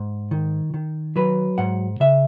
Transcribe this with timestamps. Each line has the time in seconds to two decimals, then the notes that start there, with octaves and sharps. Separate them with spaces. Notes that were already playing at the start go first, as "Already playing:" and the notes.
Already playing: G#2
0.31 D#3
0.74 D#3
1.16 F#3 B4
1.58 G#2 F#5
2.00 C#3 E5